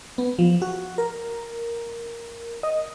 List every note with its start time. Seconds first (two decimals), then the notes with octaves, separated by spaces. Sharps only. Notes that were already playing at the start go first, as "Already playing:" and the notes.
0.18 B3
0.39 F3
0.62 F#4
0.98 A#4
2.63 D#5